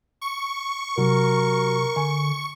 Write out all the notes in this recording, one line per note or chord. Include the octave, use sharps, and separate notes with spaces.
C#6
C3 F#3 A#4
D3 G#5